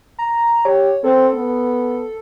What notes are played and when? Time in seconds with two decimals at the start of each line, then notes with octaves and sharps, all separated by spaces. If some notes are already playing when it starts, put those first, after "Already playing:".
0.19 A#5
0.65 G4 C#5
1.04 C4 A4
1.34 B3